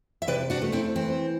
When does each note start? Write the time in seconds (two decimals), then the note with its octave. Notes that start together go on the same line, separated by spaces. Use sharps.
0.22 E5
0.27 C3 B4 D5
0.50 D4 F#4
0.62 A3
0.72 C4 E4
0.96 E3 C4